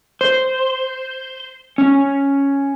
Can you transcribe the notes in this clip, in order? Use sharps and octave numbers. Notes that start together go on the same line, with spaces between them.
C5
C#4